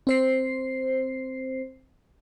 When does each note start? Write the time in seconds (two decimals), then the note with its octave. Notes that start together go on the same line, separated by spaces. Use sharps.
0.07 C4 C5 C7